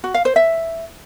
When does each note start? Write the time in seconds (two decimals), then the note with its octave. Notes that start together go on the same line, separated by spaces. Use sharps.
0.04 F#4
0.14 F5
0.25 C5
0.36 E5